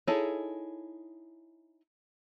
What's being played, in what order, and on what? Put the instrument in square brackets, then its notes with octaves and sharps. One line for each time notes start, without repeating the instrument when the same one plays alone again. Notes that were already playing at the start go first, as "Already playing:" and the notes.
[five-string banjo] D#4 E4 G#4 A4 C#5